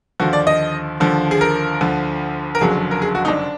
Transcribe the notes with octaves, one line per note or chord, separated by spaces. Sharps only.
D#2 D3 F3 F#4
D5
D#5
D#2 D3 F3
G#4
A#4
D2 D3 F3
A#4
F#1 F2 D3 F#3 G#4
A#4
G#4
F#4
D#4
D4